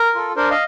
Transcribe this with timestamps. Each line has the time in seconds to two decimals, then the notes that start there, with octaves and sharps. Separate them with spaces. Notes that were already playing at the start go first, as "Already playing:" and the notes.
Already playing: A#4
0.15 F4 A4
0.36 D4 A#4 C5
0.51 D#5 F5